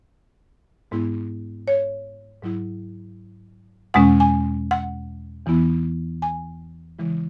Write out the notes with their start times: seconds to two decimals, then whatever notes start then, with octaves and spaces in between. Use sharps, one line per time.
0.91 G#2 G#3 B3 E4
1.68 C#5
2.42 G#2 F#3 E4
3.94 E2 B2 G#3 C#4 F#5
4.20 G#5
4.71 F#5
5.46 E2 E3 B3 E4
6.22 G#5
6.99 C#3 E3 G#3 E4